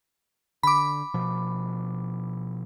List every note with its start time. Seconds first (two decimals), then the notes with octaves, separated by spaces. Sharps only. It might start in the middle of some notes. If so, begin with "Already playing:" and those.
0.63 D3 B5 D6
1.14 B2 F3